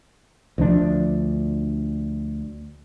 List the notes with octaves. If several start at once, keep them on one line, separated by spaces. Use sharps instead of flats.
D2 F3 D4